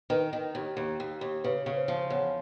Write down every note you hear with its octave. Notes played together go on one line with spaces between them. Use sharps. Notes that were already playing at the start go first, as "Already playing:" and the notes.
D#3 B4
D#3
D#2
D#2
D#2
D#2
C#3 B4
C#3
C5
F3
E2 C#5